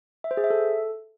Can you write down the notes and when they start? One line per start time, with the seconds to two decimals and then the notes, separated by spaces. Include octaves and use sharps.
0.24 E5
0.31 C5
0.37 G#4
0.44 E5
0.50 A4